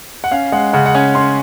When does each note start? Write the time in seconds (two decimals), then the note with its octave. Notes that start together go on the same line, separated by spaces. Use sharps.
0.24 F#5
0.31 C#4 F5
0.52 G#3 F#5
0.73 C#3 F#5
0.86 F#5
0.95 C#4 G#5
1.15 C#4 C6